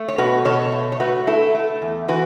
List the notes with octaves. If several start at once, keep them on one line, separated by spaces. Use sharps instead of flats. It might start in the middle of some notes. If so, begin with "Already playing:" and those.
Already playing: A3
C#5
B2 F#4 B4
B2 A4 C#5
A3
C#5
A3 F#4 B4
A3 E4 A4
A3
E2
E3 F#4 B4